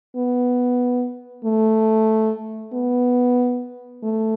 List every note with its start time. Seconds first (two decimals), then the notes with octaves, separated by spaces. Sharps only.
0.16 B3
1.44 A3
2.73 B3
4.02 A3